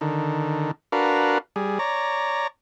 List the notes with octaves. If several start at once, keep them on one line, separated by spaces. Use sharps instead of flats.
D3 D#3
D4 F#4 A#4 B4 F5
G3 G#4
C#5 D5 A#5